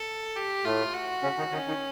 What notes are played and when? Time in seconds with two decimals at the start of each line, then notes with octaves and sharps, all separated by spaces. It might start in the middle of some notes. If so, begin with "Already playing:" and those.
Already playing: A4
0.36 G4
0.65 A2 A3 F4
0.94 F#4
1.23 C#3 C#4
1.38 D#3 D#4
1.52 D#3 C#4 D#4
1.68 D#3 D#4